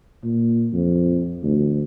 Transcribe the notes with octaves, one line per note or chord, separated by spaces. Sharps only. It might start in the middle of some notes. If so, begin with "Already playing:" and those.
A#2
F2
D2